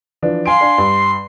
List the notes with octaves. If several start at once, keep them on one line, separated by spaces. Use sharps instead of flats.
E3 F3 D4
F5 G#5 C6 D7
D4 F5 G#5
G2